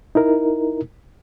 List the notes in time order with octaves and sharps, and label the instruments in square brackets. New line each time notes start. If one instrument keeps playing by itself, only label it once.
[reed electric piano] D#4 E4 A#4